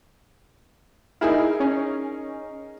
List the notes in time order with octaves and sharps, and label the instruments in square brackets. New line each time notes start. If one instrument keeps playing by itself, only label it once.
[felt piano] D#4 G#4 A#4 [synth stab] E4
[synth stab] C#4